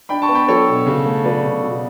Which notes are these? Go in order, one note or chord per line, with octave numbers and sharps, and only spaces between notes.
D4 G5 B5
A5 C#6
B3
G5 B5
F#3 A4 C#5
B2
C#3
A3
F#3 B4 D5
C#3
B2